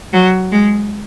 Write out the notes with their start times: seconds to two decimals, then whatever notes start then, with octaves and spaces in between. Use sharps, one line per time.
0.13 F#3
0.52 G#3